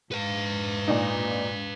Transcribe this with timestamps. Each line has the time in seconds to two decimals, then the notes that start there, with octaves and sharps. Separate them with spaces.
0.12 G#2 B4 F5
0.88 A#2 D4 D#4